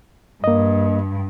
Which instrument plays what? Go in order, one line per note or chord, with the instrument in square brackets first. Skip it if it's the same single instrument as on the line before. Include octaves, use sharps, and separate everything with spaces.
[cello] G2 [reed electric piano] A#3 D#5